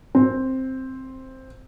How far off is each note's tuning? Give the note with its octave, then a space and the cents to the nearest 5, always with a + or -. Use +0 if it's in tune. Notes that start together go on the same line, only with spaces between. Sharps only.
C4 +5